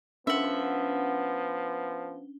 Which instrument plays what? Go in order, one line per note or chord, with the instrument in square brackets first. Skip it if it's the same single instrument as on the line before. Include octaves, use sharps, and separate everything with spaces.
[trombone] F3 [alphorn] B3 [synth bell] C#4 D4 G7 [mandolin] E5 F#5